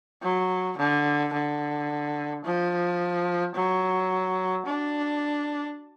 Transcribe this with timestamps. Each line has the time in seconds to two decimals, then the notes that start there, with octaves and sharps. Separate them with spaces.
0.23 F#3
0.78 D3
1.33 D3
2.44 F3
3.55 F#3
4.67 D4